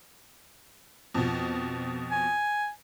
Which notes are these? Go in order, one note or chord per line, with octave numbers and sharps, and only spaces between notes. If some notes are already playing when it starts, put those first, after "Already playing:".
F2 B2
G#5